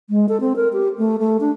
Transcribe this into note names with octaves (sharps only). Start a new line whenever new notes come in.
G#3
A4
C4
A#4
G4
A3
A3
D4